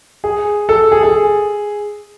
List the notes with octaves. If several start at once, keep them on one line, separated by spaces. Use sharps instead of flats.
G#4
A4
G#4
G#4